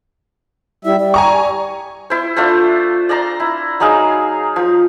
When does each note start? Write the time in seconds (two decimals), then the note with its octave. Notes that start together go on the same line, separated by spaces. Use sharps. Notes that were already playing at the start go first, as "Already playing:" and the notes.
0.85 G3 E4 E5
0.99 G3 D5
1.14 G#5 A#5 C#6
2.10 E4 C5
2.36 A3 D4 F4 C5
3.09 D5 A5 A#5 C6
3.40 E4
3.80 F#3 D#4 G#4 F5
4.56 F3